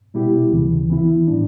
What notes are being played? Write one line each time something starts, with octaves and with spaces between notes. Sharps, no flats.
B2 G3 B3 E4 G4
D2 C#3 E3
E3 B3 E4
A2 G3 D4